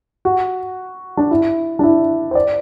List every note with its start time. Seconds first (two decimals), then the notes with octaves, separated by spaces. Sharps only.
0.25 F#4
1.17 D4
1.31 E4
1.79 D4
1.83 E4
2.31 C5
2.35 D5